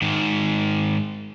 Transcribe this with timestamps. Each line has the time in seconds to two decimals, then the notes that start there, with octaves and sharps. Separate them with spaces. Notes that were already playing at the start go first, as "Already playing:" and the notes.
0.02 G#2 D#3